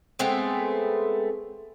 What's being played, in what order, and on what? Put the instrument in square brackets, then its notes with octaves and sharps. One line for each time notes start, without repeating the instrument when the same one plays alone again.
[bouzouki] G#3 A3 B3 C4